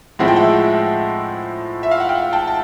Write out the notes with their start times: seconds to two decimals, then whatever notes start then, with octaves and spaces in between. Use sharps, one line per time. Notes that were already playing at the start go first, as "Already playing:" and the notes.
0.19 A2 F3 G#3 C4 E4 F#5
0.28 G5
0.36 E5 F#5
1.83 E5
1.91 F5
2.00 F#5
2.09 F5 G5
2.33 G5 A5
2.47 A5